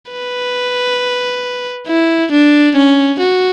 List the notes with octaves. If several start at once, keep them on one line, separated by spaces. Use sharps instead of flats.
B4
E4
D4
C#4
F#4